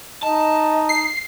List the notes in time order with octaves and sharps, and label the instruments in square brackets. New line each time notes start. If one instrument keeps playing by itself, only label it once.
[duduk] D#4 [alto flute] D#5 [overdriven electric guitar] A5
[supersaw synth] C7